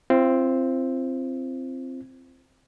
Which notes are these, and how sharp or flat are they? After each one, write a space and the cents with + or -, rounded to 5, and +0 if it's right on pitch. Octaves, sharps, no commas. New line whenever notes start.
C4 +5 F4 -40